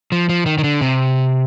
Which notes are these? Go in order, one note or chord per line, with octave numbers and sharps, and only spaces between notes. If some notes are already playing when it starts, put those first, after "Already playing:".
F3
F3
D#3
D#3
D3
C3